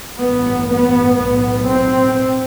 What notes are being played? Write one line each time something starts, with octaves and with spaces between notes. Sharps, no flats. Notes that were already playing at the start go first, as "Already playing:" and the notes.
A1 G2 B3
B3
B1 A2 B3
C4